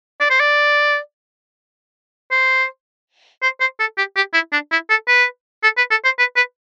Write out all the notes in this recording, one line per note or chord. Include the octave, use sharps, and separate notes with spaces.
D5
C5
D5
C5
C5
C5
A4
G4
G4
E4
D4
E4
A4
B4
A4
B4
A4
C5
B4
B4